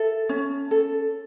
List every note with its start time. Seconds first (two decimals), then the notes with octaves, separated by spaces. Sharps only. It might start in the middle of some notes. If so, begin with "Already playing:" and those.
Already playing: A4 E5
0.29 C#4
0.71 A4